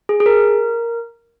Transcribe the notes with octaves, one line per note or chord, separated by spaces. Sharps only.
G#4
G#4
A#4